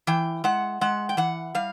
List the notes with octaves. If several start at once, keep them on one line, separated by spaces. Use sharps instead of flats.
E3 G5
G#3 F#5
G#3 F#5
G5
E3 F#5
G3 F5